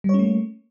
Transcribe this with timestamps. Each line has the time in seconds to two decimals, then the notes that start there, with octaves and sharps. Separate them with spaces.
0.04 G3
0.09 C#5
0.14 C#4
0.19 A3
0.24 A#3